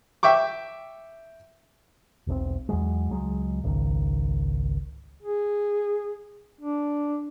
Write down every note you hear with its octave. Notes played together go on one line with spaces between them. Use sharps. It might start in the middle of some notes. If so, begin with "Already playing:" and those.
E5 G5 C#6 D6
E1 B1 C3 C4
E2 F#3 G#3
C#2 F#3 G#3
G#1 C#2 D#3
G#4
D4